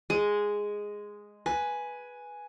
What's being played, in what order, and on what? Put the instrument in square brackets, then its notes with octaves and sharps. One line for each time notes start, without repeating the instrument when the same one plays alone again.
[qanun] G#3 [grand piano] D#7
[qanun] B4 [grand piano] G#5